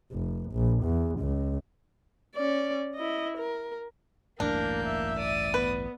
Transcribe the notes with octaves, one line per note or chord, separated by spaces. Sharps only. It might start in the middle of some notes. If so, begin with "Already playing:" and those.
F1
A#1
E2
C#2
C#4 D5
E4 D#5
A#4
A1 D2 G2 A#3 D4 A#4 G6
E5
D5 D#6
B3 B4